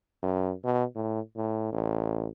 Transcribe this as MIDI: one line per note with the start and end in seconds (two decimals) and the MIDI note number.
0.22 0.53 42
0.65 0.84 47
0.95 1.20 45
1.36 1.70 45
1.72 2.27 33